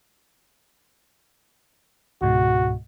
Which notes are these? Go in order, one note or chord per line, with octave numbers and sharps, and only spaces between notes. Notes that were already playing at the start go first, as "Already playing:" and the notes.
C#2 G#2 B2 F#4